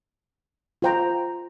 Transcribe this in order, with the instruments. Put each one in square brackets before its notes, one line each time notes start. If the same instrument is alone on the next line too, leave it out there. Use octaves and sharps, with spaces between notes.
[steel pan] F4 C5 G5 A#5